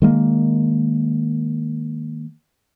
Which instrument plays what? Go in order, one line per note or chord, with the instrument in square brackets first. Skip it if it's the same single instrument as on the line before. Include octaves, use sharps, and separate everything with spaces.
[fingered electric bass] D#3 G#3 A#3